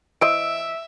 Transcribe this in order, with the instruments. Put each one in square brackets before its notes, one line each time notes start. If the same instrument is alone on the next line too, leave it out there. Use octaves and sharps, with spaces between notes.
[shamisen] E3 C5 D#5 [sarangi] E5 [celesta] E6 D7